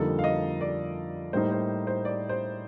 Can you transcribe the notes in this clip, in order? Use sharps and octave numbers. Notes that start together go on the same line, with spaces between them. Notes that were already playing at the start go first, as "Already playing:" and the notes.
Already playing: F2 D3 G3 A#3 D#4 A4
F5
D#5
D5
A2 G3 A#3 D#4 C5
C5
C5
D5
C5